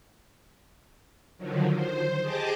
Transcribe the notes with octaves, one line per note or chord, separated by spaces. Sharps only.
D3 D#3 F3 F#3
C5
G4 G#4 D#5 A5 D6